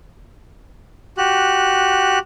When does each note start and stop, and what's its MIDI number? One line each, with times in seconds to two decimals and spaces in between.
1.18 2.19 66
1.18 2.19 67
1.18 2.19 90